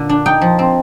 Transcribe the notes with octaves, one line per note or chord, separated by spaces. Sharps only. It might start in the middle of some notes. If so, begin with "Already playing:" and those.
Already playing: A#2 D3
D4
D#4 G5
F3
C4